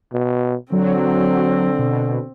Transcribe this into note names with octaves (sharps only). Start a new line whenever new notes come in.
B2
D3 F#3 C4
B2